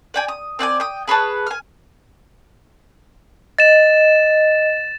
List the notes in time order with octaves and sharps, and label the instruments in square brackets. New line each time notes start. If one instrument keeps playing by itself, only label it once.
[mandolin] D5 G5 G#5
D#6
C4 D5 G5 G#5
G5 D#6
G#4 B4 C#5 A5
G#5 F6
[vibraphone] D#5 [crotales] A6 E7